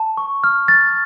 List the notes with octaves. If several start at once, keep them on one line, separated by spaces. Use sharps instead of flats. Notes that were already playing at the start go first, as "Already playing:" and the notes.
Already playing: A5
C#6
F6
A6